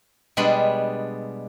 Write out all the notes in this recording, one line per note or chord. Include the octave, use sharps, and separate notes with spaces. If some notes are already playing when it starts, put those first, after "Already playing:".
B2 G3 G#3 D4 B4 B5